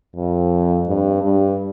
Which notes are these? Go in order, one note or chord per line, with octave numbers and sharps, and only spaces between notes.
F2
G2
G2